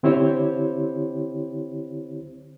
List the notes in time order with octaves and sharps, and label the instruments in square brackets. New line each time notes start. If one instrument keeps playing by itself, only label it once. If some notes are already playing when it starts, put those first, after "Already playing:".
[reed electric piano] D3 C4 E4 G4 C5 C#5